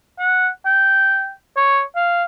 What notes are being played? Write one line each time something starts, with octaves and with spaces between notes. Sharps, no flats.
F#5
G5
C#5
F5